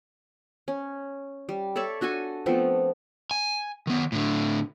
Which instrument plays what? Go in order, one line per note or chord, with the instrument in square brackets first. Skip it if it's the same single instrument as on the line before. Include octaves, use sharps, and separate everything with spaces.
[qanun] C#4
G3
A4 C#5 D5 E5
D4 F#4 A4 G#5
F3 A3 B3 C4
[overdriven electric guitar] G#5
D#3 B3
A2 D3